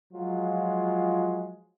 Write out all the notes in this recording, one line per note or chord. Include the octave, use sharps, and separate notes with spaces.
F3 F#3 G#3 F4